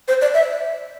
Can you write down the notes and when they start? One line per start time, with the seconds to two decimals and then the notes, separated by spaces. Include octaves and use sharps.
0.08 C5
0.22 D5
0.34 E5